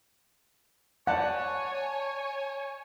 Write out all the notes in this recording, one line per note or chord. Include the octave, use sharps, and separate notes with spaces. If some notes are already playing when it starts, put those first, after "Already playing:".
C#5 D5 F#5 G#5 A5